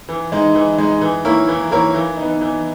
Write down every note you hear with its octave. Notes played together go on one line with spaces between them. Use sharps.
E3
G#3 D#4
E3
G#3 D#4
E3
A#3 E4 A#4 C#5
E3
A#3 E4 A#4 C#5
E3
D#4
B3
E3